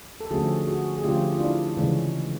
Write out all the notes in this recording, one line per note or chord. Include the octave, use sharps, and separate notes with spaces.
A4
D3 F3 A3 C#4 F#4 G#4
F#4 G#4
G#4
D3 F3 A3 C#4 F4 G4
F4
D4 E4
C#3 E3 G#3 C#4